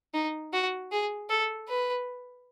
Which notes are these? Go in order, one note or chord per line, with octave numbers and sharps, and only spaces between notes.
D#4
F#4
G#4
A4
B4